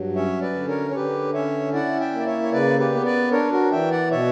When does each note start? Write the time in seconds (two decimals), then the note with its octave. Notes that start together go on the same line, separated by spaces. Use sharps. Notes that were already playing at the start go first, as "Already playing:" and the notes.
Already playing: G2 F#3
0.15 C#4 C#5 E5
0.42 B4 D5
0.55 D3
0.68 A#4 C#5
0.91 C#5
0.95 D3 G4 B4
1.34 C#4 C#5 E5
1.73 E4 D5 F#5
2.00 E5 G5
2.13 A#3
2.20 D5
2.26 C#5 E5
2.43 C#5
2.52 C#3 B4 D5
2.79 G4 B4
2.92 B3
3.05 B4 D5
3.32 D4 A#4 C#5
3.52 F#4 A#4
3.71 E3 E5 G5
3.91 D5 F#5
4.11 B2 C#5 E5